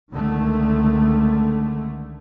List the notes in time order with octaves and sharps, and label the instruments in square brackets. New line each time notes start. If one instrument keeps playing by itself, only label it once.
[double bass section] C#2 D3 D#3 A3